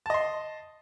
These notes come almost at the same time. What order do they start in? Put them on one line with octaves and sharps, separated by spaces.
A5 D#5 C6